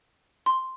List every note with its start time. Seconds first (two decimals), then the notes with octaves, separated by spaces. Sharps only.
0.46 C6